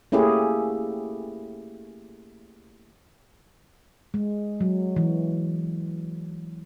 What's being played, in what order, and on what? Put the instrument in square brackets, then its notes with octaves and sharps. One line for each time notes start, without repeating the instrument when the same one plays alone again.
[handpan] A3 A#3 C#4 E4 G4 G#4
G#3
F#3
E3